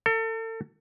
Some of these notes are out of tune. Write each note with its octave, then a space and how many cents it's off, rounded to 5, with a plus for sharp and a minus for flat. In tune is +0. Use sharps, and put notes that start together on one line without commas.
A4 +35